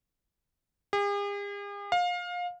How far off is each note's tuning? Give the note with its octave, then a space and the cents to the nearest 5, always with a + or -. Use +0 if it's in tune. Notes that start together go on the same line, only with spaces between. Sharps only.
G#4 -45
F5 +25